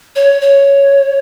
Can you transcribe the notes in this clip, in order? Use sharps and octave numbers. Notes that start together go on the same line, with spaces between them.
C#5
C#5